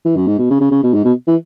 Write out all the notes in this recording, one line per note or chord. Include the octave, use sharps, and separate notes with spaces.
E3
F#2
G#2
B2
C#3
C#3
C#3
B2
G#2
B2
E3